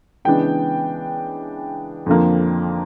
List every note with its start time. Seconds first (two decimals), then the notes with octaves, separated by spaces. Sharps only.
0.25 C#3 E3 G#3 B3 D4 G5
2.06 F2 D3 F3 A#3